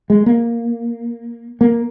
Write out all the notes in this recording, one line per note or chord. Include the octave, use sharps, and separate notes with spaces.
G#3
A#3
A#3